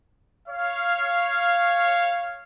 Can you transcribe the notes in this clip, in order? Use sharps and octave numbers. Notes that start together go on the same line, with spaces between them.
C#5 F5